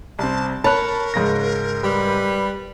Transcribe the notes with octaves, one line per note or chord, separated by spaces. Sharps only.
C2 C4 A5
A#4 C#5 A5 B5 F#6
G#2 C#3 A#6
G3 B4